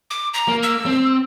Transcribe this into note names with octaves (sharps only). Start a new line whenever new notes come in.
D6
A#5
A#3
E6
C4